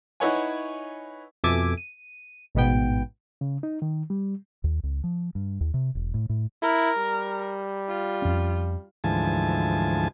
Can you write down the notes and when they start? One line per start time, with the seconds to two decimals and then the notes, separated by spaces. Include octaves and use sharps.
0.20 D#4 E4 B4 C#5 F#5 G#5
1.44 F2 B2 A4 E5 G#5 D6
1.78 D#7
2.55 A1 G#2 B2 B3 G5
3.41 C#3
3.63 D#4
3.82 D#3
4.10 G3
4.64 D#2
4.83 C#2
5.04 F3
5.35 G2
5.61 D#2
5.74 C3
5.95 E1
6.14 A2
6.29 A2
6.62 E4 A#4
6.98 G3
7.88 F4
8.22 F2 C#4
9.04 D2 G#2 E3 F3 G#5 A5